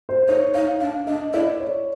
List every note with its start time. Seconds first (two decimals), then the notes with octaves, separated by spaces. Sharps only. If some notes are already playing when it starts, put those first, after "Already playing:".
0.09 C5
0.28 D#4 C#5
0.54 D#4 F5
0.81 D4 F5
1.07 D4 D#5
1.33 E4 D5
1.60 C#5